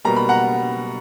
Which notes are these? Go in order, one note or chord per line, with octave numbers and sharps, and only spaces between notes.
B2 G3 A#3 A#5
B5
F#5 A#5